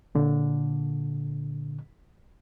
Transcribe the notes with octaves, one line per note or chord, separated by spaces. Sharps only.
A#2 D3